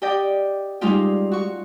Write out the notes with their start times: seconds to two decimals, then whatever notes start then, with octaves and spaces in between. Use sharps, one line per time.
0.02 G4 D5 D#5 G5
0.81 G3 G#3 C#4 D#4 F4 G4
1.31 F#4 C#6